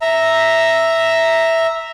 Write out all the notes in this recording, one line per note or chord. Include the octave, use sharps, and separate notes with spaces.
E5 A#5